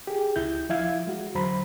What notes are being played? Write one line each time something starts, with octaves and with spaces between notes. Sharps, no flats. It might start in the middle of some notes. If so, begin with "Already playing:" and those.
G4 G#4
C#2 E4 G6
F3 E4 E5 F5 G#6
G#3 F#4
E2 D3 F#3 C5 A#5 B5